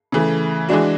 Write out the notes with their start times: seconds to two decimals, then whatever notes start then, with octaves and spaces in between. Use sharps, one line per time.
0.12 C#3 E3 A3
0.69 E3 G#3 D4 F#4